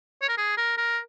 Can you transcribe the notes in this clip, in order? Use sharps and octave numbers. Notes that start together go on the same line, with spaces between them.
C#5
A#4
G#4
A#4
A#4